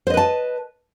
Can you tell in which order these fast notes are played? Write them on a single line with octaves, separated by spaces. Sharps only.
C5 D#5 B4 A5